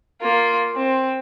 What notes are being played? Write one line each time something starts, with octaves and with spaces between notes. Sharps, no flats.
A#3 F4
C4